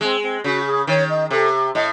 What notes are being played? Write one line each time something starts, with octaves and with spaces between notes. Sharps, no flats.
G#3 C4
C4
C#3 F#4
G#4
D#3 C#5
D#5
C3 A4
A2 D#5